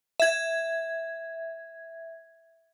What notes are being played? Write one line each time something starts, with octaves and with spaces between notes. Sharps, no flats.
E5 G#6